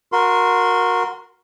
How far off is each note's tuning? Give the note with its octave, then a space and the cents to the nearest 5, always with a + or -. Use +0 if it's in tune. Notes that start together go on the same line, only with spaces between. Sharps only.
F#4 -25 A#4 +5 C6 -15